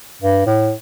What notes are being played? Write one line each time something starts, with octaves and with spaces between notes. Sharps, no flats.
G2
A2